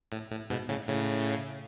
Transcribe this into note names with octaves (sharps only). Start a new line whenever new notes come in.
A2
A2
G#2 B2
A2 C#3
A2 C#3